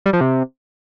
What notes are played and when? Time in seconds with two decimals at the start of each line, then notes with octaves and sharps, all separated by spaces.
0.06 G3
0.13 F3
0.21 C3